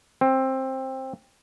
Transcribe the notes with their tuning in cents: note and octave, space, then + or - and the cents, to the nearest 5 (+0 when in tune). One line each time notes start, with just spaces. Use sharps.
C4 +15